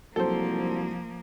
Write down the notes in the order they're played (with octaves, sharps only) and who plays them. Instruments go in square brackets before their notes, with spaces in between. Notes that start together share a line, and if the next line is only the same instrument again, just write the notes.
[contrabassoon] C2 [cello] F3 A#3 [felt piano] F#3 [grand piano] A4 C5